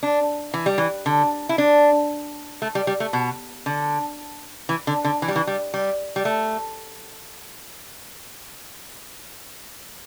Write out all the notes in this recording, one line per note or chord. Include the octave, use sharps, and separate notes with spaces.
D4
E3
G3
E3
D3
E4
D4
A3
G3
G3
A3
B2
D3
E3
D3
D3
E3
G3
E3
G3
G3
G3
A3